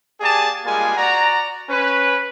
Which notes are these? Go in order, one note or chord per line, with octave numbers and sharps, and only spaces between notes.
A#3 G4 G#4 D5 G#5 A5
G3 G#3 A#3 F4 G#4 G#5
F#4 D5 F#5 A#5
C#4 B4